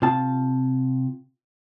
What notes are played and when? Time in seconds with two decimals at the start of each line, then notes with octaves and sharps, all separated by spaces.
0.02 C3 F4 A5